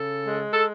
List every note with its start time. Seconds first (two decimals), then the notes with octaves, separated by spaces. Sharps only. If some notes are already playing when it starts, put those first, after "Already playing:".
Already playing: C#3 A4
0.26 G#3
0.53 A4